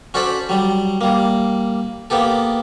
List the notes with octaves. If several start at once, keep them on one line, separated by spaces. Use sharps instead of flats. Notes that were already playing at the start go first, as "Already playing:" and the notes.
C#4 F#4 A4 C5 D5 B5
F#3 G3
G3 A#3
A#3 B3 G4 A4